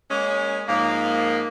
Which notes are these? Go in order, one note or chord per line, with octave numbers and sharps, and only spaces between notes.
G#3 A#3 C#4
G#2 F3 A#3